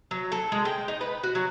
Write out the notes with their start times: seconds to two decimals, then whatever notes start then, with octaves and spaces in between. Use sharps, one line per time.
0.11 F#3
0.32 A4
0.52 G#3
0.65 G5
0.88 D#4
1.01 B4
1.23 F#4
1.35 F#3